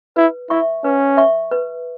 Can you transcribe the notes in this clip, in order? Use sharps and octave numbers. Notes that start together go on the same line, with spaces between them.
E4 B4
E4 E5 C#6
C#4 B4
E5 C#6
B4